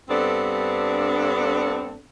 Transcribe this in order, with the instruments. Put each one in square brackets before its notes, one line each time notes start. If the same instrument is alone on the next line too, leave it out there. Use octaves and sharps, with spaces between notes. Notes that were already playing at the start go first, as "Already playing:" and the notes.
[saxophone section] G2 B3 C4 D4 A4